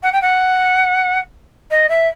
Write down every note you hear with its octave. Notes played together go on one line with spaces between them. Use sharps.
F#5
G5
F#5
D#5
E5